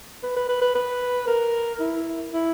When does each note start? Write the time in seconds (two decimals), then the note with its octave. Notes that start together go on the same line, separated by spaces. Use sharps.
0.23 B4
0.36 B4
0.49 B4
0.62 B4
0.75 B4
1.27 A#4
1.80 E4
2.33 E4